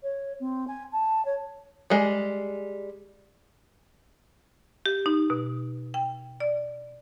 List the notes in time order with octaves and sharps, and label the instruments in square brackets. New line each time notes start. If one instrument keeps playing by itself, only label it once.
[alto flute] C#5
C4
G#5
A5
C#5
[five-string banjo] G3 G#3
[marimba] G4
D#4
B2
G5
D5